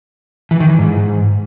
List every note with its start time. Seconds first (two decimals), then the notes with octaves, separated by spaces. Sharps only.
0.51 E3
0.60 D#3
0.70 E3
0.79 G#2